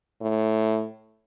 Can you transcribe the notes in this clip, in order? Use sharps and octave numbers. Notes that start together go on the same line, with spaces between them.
A2